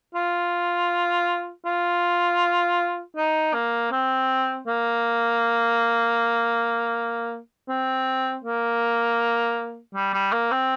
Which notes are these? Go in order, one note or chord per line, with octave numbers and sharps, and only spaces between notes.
F4
F4
D#4
A#3
C4
A#3
C4
A#3
G3
G3
A#3
C4